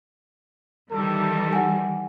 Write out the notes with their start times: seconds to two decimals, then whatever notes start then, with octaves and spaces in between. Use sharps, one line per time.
0.91 D#3 E3 G3 A4
1.53 F#5 G#5